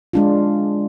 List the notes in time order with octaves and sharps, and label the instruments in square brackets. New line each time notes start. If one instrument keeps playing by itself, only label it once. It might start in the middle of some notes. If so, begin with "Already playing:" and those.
[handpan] G#3 D4 F4